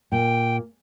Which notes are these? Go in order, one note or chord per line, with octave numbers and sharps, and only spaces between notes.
A#2 G5